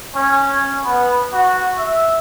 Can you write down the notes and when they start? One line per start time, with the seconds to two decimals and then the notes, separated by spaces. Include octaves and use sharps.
0.15 C#4
0.84 B3
1.32 F#4
1.77 E5